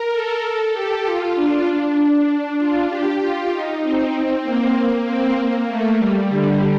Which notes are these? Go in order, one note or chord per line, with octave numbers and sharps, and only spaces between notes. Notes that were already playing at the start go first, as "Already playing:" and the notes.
Already playing: A#4
A4
A4
G4
F4
D4
D4
D4
F4
G4
F4
D#4
C4
C4
A#3
A#3
C4
A#3
A3
G3
D3